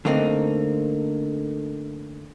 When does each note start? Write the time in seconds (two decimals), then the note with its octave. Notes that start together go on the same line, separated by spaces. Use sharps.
0.05 D3 A3 A#3 C4 D#4